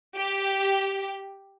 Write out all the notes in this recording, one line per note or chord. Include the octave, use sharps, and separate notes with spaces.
G4